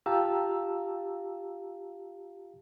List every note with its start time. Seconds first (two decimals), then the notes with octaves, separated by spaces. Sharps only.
0.06 F4 G4 F5 A5 A#5 E6